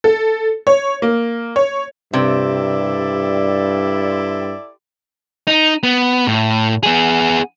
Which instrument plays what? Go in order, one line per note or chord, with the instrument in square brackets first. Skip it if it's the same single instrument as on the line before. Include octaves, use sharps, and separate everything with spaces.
[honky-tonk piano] A4
C#5
A#3
C#5
[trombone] G2 [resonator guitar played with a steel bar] C3 [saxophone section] E4 A4 D5
[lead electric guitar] D#4
B3
A2
B3 G#4